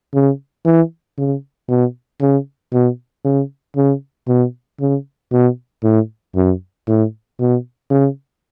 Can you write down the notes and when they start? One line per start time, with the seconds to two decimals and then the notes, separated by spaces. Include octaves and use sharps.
0.14 C#3
0.65 E3
1.18 C#3
1.69 B2
2.21 C#3
2.73 B2
3.25 C#3
3.76 C#3
4.28 B2
4.80 C#3
5.32 B2
5.84 A2
6.36 F#2
6.88 A2
7.40 B2
7.91 C#3